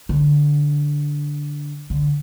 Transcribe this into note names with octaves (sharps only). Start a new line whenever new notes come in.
D3
D3